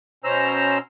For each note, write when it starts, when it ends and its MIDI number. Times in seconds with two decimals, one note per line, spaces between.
0.24 0.78 47
0.24 0.78 61
0.24 0.78 72
0.24 0.78 82
0.24 0.78 88